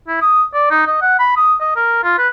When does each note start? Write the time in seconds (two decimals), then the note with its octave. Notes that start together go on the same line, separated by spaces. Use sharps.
0.08 E4
0.22 D#6
0.54 D5
0.71 D#4
0.87 D#5
1.02 F#5
1.19 B5
1.36 D#6
1.60 D#5
1.76 A#4
2.03 F4
2.18 B4